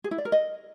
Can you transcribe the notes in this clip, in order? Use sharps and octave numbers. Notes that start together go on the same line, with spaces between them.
G#4
E4
D5
A#4
D#5